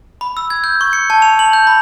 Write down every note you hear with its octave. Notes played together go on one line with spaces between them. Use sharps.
B5
E6
G#6
G6
C#6
C#7
A5
F7
F#7
G6
B5